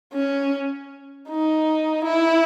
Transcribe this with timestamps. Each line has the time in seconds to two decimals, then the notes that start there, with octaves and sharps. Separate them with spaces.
0.14 C#4
1.29 D#4
2.04 E4